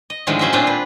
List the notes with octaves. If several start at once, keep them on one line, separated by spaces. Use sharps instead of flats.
D#5
A2 D3 D#3 F3 G#3
F#3 C#4 C5 D#5 E5
A#2 C4 D4 F4 C5
B4